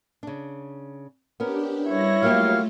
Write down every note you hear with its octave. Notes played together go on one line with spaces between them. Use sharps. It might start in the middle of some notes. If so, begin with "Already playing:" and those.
C#3 D4
B3 C#4 D4 G4 A#4
G3 E4 C#5 A#6
F#3 A3 A#3 F4 G4 F5